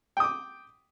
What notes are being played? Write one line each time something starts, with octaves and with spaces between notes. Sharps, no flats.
G5 D6 D#6